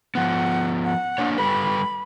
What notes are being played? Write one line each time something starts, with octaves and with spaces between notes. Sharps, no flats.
F3 B3 F#5
F#5
A#3 D4 C#5
G3 A4 B4 B5